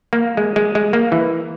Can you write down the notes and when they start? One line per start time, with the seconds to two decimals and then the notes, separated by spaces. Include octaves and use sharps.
0.13 A#3
0.37 G#3
0.56 G#3
0.75 G#3
0.93 A#3
1.12 E3